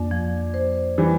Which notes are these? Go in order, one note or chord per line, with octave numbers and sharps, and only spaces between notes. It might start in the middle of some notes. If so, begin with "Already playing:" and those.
Already playing: F2 A#3 D4
F3
C5
E3 G3